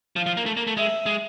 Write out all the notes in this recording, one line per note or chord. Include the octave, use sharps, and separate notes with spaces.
F3 F5
F3
A#3
A3
A#3
A3
G#3 E5
G#3